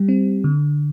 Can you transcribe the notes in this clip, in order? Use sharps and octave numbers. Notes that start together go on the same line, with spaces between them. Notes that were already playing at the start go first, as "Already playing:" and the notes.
Already playing: G3 G4
C4
D3